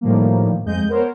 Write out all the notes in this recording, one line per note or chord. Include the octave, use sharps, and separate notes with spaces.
A2 D#3 F3 G3 A#3
F2 G#3 D#5 G6
B3 A#4 C5 C#5